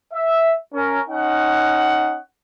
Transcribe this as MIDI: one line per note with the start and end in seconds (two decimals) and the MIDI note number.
0.13 0.53 76
0.74 1.00 61
0.74 1.00 70
1.09 2.18 61
1.09 2.18 63
1.09 2.18 78